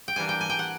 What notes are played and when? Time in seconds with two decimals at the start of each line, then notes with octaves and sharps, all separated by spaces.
0.08 G5
0.16 E3 G3 A#3 D4 G#5
0.29 G5
0.41 G#5
0.50 G5
0.59 F#5